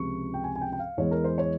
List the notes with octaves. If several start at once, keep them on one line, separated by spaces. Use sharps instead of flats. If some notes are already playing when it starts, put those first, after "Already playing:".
Already playing: C#2 C3 F3 C#6
G5
G#5
G#5
G5
G5
F5
E2 E3 G#3 E4 C#5
A#4
C5
C#5